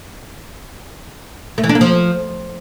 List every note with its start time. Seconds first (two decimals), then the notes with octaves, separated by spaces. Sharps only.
1.58 A3
1.64 E3
1.69 D4
1.75 A#3
1.81 F3